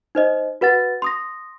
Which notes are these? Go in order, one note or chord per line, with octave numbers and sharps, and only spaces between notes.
D#4 C5 D#5
F#4 B4 F#5 A6
C6 D#6 A#6